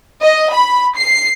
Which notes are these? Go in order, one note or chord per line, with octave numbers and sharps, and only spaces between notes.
D#5
B5
C7